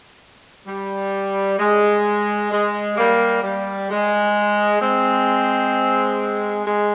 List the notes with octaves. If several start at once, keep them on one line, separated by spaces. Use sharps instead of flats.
G3
G#3
G#3
G3 A#3
G3
G#3
G#3 C4
G#3